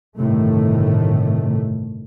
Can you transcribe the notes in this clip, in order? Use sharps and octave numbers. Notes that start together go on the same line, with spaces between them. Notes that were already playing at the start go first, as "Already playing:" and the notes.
G1 A2 C3 D#3 A3